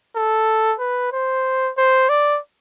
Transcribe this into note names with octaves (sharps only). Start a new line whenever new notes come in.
A4
B4
C5
C5
D5